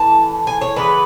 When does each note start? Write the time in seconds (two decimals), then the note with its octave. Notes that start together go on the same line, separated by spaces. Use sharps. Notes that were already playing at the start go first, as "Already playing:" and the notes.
Already playing: A2 E3 A5
0.47 G#5
0.61 C#5
0.76 C#3 E3 B3 B4